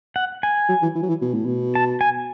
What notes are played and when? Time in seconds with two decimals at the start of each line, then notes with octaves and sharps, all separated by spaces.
0.16 F#5
0.43 G#5
0.69 F#3
0.82 E3
0.95 E3
1.03 F#3
1.09 E3
1.22 B2
1.34 A2
1.46 B2
1.75 A5
2.01 G#5